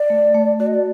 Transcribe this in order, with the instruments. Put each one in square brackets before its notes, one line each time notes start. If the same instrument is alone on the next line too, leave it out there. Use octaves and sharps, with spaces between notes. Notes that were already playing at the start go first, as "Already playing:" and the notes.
Already playing: [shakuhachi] D5
[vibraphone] A3
A3
[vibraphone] F#4 [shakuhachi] D5
[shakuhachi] D#5
D5